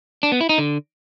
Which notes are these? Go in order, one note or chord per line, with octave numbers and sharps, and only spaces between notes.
D4
B3
E4
D#4
D3